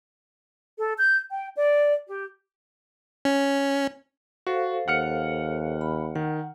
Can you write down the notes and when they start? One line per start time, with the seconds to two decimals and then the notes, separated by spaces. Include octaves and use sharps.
0.79 A4
0.99 G6
1.30 G5
1.56 D5
2.07 G4
3.25 C#4
4.47 F#4 A4 C5 F5
4.88 D#2 F#5 F6 C#7
5.81 B5
6.15 D#3 F#5